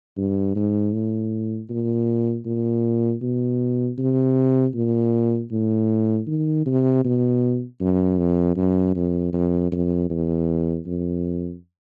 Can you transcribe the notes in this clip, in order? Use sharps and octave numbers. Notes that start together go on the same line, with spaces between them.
G2
G#2
A2
A#2
A#2
B2
C3
A#2
A2
D#3
C3
B2
F#2
F2
F#2
F2
F2
F2
E2
F2